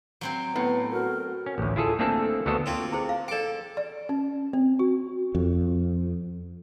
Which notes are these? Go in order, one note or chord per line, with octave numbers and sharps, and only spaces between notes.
F#3 C4 C5
A2 B3
F#4 A#4
C#4
A1 D2
E4 F4 G#4 A4
A3 A#3 C4 D4 A4
D2 B3 D4 F#4 A4 D#5
A#3 C4 F4
E4 G#4 C5
F5
A4 D5 G5 D6
D5
C#4
C4
F#4
F2